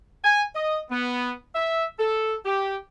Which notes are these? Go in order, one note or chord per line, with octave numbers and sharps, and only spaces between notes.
G#5
D#5
B3
E5
A4
G4